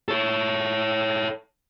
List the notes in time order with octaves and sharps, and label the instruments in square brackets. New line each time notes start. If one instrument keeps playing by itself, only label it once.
[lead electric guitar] A4 C#5